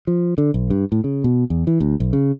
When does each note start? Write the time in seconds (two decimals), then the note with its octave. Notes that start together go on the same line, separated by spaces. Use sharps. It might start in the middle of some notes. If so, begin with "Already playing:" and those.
0.07 F3
0.38 D3
0.54 B1
0.70 G2
0.92 A2
1.04 C#3
1.24 B2
1.50 E2
1.67 E3
1.80 D2
2.00 B1
2.13 C#3